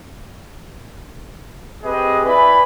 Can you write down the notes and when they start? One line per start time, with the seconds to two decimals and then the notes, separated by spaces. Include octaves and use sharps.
1.83 C4 G4 G#4 B4 D#5
2.25 E4 B4 D5 E5 G#5 B5